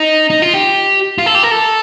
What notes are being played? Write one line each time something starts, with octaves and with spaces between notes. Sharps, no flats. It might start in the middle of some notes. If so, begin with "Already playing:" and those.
Already playing: D#4
D#4
F4
G4
F4
A4
G4
A#4
A4